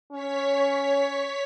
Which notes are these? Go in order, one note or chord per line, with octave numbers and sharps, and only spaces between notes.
C#4 C#5 B6